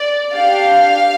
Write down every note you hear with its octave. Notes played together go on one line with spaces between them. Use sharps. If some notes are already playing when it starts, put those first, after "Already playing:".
Already playing: D5
D4 G4 F5